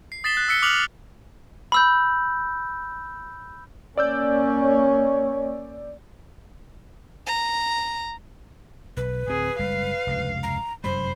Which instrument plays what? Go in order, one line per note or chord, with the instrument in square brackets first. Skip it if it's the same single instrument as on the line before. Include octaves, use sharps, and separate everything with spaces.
[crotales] C7
D#6 A6 B6 C7 E7 G7
F#6
E6 B6 C#7 G7
D6 D#6 F6 F#6 F7 F#7
[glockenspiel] B5 E6 G6
[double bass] A#3 C#4 [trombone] C#5 [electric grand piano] D5 E6 G6
[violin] A#5
[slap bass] B1 [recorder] B4
[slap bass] D1 C4 [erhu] G#4
[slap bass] F#1 G3 G#3 [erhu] F5
[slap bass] F1 C#2 G2
[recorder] A#5
[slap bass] F1 F#2 G3 [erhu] C5 [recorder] B5